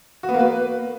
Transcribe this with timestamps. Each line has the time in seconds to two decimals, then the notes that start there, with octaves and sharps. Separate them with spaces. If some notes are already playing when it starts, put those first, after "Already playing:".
0.23 F#4
0.29 B3
0.34 A#3
0.39 B4